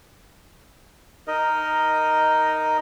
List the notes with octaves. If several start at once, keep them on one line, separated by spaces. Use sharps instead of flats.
D#4 A#4 D#5